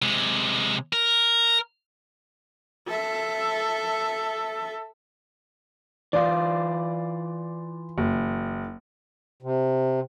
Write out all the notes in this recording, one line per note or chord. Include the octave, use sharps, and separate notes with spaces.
C3 G#3
A#4
A4 E5
E3 F4 D5
F#1
C3